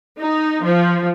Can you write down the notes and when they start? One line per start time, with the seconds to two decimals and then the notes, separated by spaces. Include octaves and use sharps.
0.19 D#4
0.63 F3